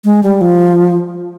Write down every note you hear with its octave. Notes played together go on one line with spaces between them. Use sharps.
G#3
G3
F3